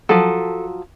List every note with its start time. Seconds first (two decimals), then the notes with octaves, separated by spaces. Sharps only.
0.09 F3 F#3 A4